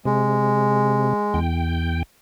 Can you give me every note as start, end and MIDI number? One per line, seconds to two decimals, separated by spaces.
0.05 1.13 48
0.05 1.39 56
1.34 2.03 40
1.34 2.03 79